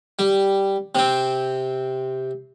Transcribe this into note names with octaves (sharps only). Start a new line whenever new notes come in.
G3
C3 C4